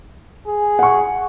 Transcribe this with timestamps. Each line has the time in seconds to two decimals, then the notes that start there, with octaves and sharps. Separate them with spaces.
0.47 G#4
0.79 F#5 C#6